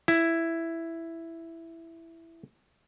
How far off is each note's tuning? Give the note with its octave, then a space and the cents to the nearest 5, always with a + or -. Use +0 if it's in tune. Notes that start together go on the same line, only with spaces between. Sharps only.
E4 +5